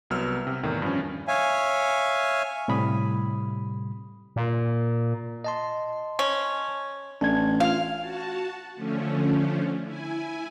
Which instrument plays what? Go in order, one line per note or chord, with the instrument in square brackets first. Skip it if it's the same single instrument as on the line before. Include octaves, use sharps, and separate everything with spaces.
[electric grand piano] C2 F#3 B3 E6 F6
C3
E2 A2 D#3
G2 F3 C#4
[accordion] C#5 E5 F5 G#5
[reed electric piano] A2 C3 G3 B5 D#6
[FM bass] A#2
[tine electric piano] D#5 A5 C6
[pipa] C#4
[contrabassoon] A1 [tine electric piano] D4 G#6
[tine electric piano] F4 [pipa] F5
[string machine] F#4 A5
D3 F3 A3 C#4
E4 G#5